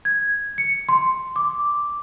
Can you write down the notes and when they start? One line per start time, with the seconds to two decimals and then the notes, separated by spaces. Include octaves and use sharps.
0.05 G#6
0.58 C#7
0.89 C6
1.36 D6